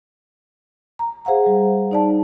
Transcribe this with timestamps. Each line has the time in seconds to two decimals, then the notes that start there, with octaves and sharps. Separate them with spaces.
0.99 A#5
1.25 G#4 C5 F5 F#5 A#5
1.46 G3
1.91 D#4 D5 A5